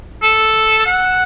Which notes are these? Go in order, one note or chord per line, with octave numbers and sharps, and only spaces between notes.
A4
F#5